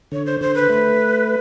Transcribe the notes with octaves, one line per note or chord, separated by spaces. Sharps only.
D3 C#5
C5
D3 C5
B4
A3